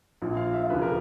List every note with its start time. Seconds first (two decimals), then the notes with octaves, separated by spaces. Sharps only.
0.22 A#1 A#2 F3
0.37 F5
0.53 E5
0.70 E1 D2 C#3 F3 B4
0.82 A#4